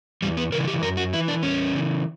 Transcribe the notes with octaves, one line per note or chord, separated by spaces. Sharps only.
E2 G3
B3
C#3 E3 A#4
G4
F#2 A#4
F#4
E3 E4
D4
E2 C#4
C#3 E3